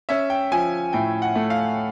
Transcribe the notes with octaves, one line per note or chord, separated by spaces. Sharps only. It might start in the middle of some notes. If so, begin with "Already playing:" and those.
C#4 E5
G5
F3 G#5
A2 G5
F#5
A3
F5